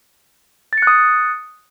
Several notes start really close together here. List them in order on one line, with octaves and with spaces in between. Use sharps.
A6 C#7 F#6 D#6